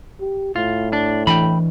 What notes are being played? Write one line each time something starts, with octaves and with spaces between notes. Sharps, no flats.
G4
A2 F4
D4
E3 D4 G5 G#5 B5